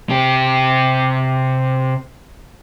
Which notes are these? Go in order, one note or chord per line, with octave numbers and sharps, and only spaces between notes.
C3 G4